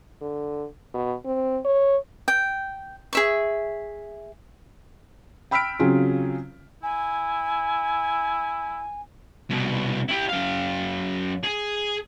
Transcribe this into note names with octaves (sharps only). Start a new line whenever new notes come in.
D3
B2
C4
C#5
G5
G#4 E5 C#6
G5 B5 E6 F6 B6 D7
C#3 F#3 C4 C#4 F4 G#4
E4 G#5
C2 B2
E4 G4
F#2 F5
G#4